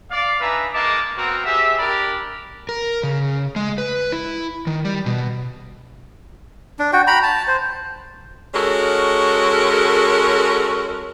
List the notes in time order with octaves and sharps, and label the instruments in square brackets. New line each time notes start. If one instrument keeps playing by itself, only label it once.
[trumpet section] D5 F5
D4 D#4 B4 E5 G#5 A#5
G#3 A#3 D#4 A5 D6
B3 C4 F#4 A#4 C5
C4 G4 G#4 E5
D4 G4 A#4 D5 B5
[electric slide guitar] A#4
C#3
G#3
B4
E4
D#3
G3
B2
[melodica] D4
F#4 G5
G5 A#5 B5
A5
C5
[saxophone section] G#3 C#4 F#4 A4 A#4